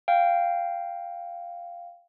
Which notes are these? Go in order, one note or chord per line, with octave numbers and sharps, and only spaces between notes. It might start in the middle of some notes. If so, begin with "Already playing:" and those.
F5 G5